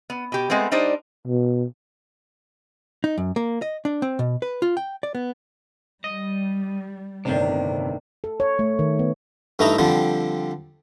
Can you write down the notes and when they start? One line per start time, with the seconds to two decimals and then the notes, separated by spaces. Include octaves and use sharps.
0.10 B3
0.32 B2 G4
0.50 G#3 A3 B3 C4
0.71 G3 D4 D#4 C5 D5
1.27 B2
3.04 D#4
3.18 F#2
3.36 A#3
3.62 D#5
3.85 D4
4.02 C4
4.19 B2
4.42 B4
4.62 F4
4.77 G5
5.03 D5
5.15 B3
6.04 G3 D#5
7.25 G1 A2 C3 D#3 D4
8.24 A4
8.40 C#5
8.59 A3
8.79 D#3
8.99 B3
9.59 G2 A3 D#4 E4 A#5
9.78 D3 F3 G3 C4